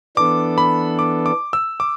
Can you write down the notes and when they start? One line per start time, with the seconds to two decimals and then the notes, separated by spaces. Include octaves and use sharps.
0.17 E3 B3 D4 A4 D6
0.58 B5
0.99 D6
1.26 D6
1.53 E6
1.80 D6